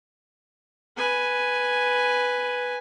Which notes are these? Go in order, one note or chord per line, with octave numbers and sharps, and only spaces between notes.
B4 G#5